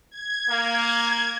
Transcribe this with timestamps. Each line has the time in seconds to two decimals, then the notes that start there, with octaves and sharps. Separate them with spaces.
0.10 G#6
0.49 A#3